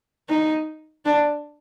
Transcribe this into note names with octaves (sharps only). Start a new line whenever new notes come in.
D#4
D4